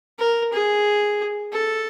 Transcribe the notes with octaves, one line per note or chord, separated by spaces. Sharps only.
A#4
G#4
A4